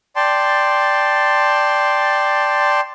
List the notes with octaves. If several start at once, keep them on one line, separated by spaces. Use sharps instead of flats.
D5 G5 A5 C6